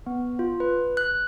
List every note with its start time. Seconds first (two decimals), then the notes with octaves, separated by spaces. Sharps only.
0.06 B3
0.39 F4
0.60 B4
0.97 F#6